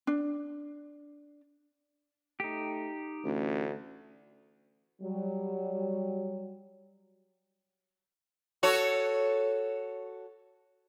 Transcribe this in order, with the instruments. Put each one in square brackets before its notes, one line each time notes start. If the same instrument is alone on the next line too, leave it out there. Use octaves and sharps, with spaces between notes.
[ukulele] D4
[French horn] A3 [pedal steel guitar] D#4 G4
[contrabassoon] A1 [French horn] D2
[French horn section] F#3 G3
[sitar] F#4 A4 C#5